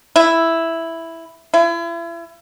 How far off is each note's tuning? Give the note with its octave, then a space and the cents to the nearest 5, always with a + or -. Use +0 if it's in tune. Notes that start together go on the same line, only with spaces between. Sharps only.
E4 +0
E4 +40